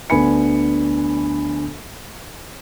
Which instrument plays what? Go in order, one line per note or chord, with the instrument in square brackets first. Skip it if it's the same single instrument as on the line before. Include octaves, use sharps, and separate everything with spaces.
[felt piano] D2 D3 B3 G#5 B5 C#7